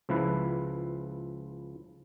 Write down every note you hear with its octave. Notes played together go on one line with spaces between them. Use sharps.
C#2 F3 E4 B4